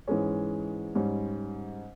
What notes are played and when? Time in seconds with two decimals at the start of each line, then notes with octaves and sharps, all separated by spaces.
0.07 G#2 E3 G#3 C#4
0.95 G#2 G3 C#4